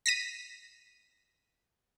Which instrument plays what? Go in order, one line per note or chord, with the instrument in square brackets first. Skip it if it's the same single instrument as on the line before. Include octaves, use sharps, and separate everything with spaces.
[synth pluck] A#6 B6 D#7